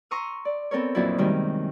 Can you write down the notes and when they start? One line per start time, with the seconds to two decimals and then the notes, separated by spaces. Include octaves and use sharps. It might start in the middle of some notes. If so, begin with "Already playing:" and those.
0.11 A#5 C6 C#6 D#6 E6
0.45 D5
0.71 B3 C4 A4 A#4 C#5
0.95 F2 A#2 F3 F#3 D4 E4
1.18 F#2 C3 D#3 G3 G#3